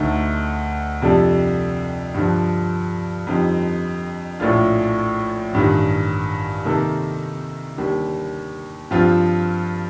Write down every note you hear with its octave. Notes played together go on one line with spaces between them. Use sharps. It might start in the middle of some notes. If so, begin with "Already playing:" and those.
Already playing: D2 D3 A3 D#4
F2 C3 G3 D4 A4
G2 D3 F3
F2 D3 G3 C4 D#4
A#1 A2 A3 D4 F4
A1 G2 D#3
C3 D#3 A#3 D#4 A4
D#2 D3 G3
G2 F3 C4 F4